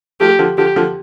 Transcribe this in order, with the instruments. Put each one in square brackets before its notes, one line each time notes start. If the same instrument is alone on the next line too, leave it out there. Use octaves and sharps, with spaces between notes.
[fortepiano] F3 A3 [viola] G4
[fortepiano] D3 F3
[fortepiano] D3 F3 [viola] G4
[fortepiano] D3 F3